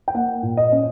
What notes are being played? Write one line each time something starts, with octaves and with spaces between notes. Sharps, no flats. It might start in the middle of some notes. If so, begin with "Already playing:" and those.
G5
A#3 F#5
A#2
D#5
C#4